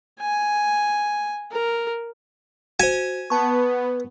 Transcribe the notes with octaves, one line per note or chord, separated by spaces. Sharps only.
G#5
A#4
F#4 C5 G#5
B3 B4 A5 C#6